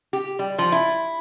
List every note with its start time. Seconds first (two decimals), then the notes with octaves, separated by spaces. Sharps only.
0.13 G4
0.39 G3
0.58 F3
0.72 E4